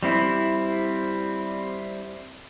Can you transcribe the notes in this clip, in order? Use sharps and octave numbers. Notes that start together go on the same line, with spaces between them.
G3 C4 E4